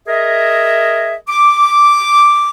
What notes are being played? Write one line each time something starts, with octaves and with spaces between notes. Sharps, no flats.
G#4 A#4 D#5 E5
D6